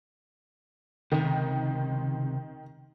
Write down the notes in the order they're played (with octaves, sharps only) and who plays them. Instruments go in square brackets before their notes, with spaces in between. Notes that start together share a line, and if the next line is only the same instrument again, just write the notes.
[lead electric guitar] C#2 C3 [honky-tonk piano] D#3